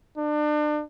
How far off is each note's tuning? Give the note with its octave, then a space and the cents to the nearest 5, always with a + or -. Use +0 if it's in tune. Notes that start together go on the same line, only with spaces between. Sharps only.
D4 +35